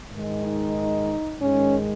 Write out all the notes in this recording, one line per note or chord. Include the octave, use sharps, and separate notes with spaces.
G#2 D#3 G#3
D#4
G#2 D#3 G#3 C#4